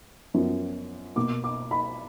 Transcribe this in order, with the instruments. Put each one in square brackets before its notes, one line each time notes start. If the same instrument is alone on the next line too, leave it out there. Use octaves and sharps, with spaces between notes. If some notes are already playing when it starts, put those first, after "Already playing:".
[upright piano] F#2 F3 B3
B2 A#3 D6
D6
B5